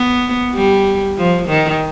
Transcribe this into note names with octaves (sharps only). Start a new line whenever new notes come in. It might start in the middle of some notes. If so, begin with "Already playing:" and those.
Already playing: B3
G3
F3
D#3